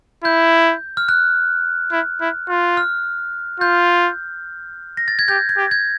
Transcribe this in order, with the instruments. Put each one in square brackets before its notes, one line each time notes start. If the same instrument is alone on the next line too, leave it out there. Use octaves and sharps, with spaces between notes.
[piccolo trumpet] E4 [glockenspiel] G6
[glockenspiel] F6
F#6
[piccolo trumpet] E4
E4
F4
[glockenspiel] F6
[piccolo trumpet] F4 [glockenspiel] G6
[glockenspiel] A#6
A6
G#6
[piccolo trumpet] G4 [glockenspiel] G6
[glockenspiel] G#6
[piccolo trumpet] G4
[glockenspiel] G#6